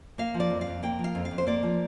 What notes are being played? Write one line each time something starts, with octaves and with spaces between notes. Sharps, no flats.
A#3 F5
F3
D5
F2
F5
F2
A#3 G5
F3
F5
F2
F5
F2
C5
A#3 D5
F3